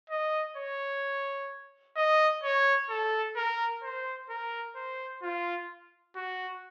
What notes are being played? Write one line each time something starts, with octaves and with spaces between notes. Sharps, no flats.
D#5
C#5
D#5
C#5
A4
A#4
C5
A#4
C5
F4
F#4